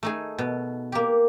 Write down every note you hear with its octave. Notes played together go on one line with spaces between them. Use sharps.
A3 D#4 G#4
B2
A#3 G4